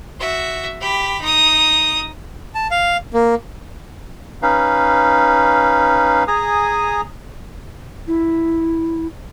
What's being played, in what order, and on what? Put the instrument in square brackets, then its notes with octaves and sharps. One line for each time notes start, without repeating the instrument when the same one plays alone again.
[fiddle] F#4 E5
G4 B5
D#4 D#6
[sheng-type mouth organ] A5
F5
A#3
[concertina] C#4 D#4 B4 F5
G#4 G#5 A#5 D#6
[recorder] E4